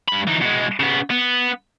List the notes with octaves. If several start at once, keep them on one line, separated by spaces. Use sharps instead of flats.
G2 B5
E3 D#4
B2 G#3
C#3 B3
B3